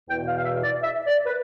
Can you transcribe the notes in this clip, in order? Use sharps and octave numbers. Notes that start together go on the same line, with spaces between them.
E2 B2 G5
F5
F5
E5
D5
E5
D5
B4